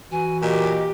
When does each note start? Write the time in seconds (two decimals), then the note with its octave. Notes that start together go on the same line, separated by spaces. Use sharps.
0.12 E3 F#4 G#5
0.42 A#2 G4 D#5